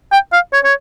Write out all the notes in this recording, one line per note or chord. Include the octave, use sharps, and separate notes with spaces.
G5
F5
C#5
C#5